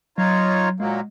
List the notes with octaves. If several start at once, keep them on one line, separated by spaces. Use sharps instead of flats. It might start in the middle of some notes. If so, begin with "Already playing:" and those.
F#3 D#4 F4 C#5
A#2 F#3 G#3 A#3